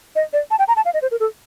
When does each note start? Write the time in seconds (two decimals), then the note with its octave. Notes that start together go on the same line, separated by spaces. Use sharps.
0.16 D#5
0.33 D5
0.51 A5
0.59 G5
0.68 A#5
0.76 A5
0.85 F5
0.94 D#5
1.02 C5
1.11 A#4
1.20 A4